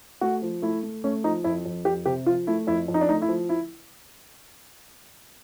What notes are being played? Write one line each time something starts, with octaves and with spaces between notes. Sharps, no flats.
A3 F#4
F3
A3 E4
A3
A3 C#4
F3 D#4
F2 E4
F2
F2 G4
C3 G4
F3 F4
A3 E4
F2 E4
F2
D#4
D4
A3 D#4
E4
F3
E4